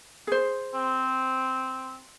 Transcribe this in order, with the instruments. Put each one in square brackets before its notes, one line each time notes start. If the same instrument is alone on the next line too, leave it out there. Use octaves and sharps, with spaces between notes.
[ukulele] G#4 C5
[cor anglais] C4